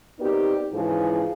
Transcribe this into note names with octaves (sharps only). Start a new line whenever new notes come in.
B3 C4 D#4 G4 A#4 D5
G#2 C#3 E3 F3 G#4